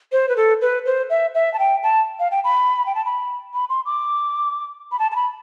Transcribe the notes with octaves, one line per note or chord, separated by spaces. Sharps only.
C5
B4
A4
B4
C5
E5
E5
A5
G5
A5
F5
G5
B5
G5
A5
B5
B5
C6
D6
B5
A5
A5
B5